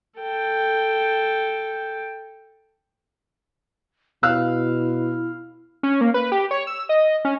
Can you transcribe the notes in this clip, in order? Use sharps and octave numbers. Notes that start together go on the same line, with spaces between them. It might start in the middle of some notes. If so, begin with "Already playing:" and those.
A4 G5
B2 E4 F5 E6 F#6
C#4
A#3
B4
G4
C#5
E6
D#5
C#4